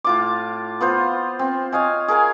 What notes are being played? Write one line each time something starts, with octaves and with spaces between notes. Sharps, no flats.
A2 F4 D6
B3 F4 C5
C4
C#5 D#5 F5 G#5
G#4 A#4 F5 G#5